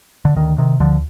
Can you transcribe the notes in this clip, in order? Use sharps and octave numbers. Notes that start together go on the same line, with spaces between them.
D3
D2 D#3
C3 D#3
D2 D3 F3